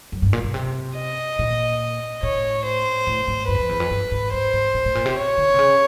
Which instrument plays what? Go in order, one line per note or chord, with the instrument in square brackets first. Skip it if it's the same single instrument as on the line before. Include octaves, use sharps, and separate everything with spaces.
[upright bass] F#2
G2
A#2
B2
C3
[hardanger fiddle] D#5
[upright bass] A#2
[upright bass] A2 [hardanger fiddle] C#5
[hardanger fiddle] C5
[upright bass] A2
G#2
[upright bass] G2 [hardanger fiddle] B4
[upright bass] E2
F2
E2
F2
G2
G#2
[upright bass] G#2 [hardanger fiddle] C5
[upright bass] G#2
A2
A2
A#2
C3
[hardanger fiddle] C#5
[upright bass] D3
C3
C#3